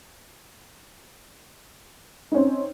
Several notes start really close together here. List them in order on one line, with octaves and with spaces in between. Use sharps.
D#4 C#4 C4